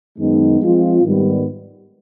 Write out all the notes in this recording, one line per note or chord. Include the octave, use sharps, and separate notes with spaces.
F#2 D#3 G#3 B3 D#4
F3 G#3 C4 F4
G#2 D#3 G3 B3